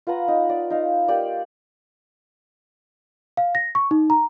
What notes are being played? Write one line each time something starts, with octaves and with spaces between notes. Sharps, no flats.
F4 B4 F#5 A#5
D#4
D5
D#4 F5
A#3 G4 D5
F5
A#6
C#6
D#4
A#5